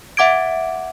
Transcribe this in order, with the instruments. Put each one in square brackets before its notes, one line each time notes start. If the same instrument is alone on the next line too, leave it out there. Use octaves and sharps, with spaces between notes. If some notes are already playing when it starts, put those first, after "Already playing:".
[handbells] E5 F#5 D6 G#6 D7